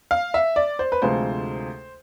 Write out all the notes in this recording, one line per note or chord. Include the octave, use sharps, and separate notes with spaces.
F5
E5
D5
C5
B4
D2 C3 F3 G#3 C5